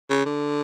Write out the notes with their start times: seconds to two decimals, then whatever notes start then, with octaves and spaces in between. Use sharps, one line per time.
0.10 C#3
0.26 D3